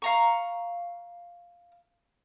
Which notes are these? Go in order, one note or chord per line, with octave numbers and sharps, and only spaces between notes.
F5 A#5 C#6